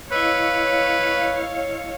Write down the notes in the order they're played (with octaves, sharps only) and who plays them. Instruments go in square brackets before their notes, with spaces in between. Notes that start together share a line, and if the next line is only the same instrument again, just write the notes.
[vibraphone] E4 D#5 E6 [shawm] B4 [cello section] C#5 F5